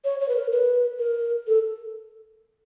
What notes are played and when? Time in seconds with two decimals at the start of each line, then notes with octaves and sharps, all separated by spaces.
0.05 C#5
0.20 C#5
0.29 B4
0.36 A#4
0.52 B4
0.99 A#4
1.47 A4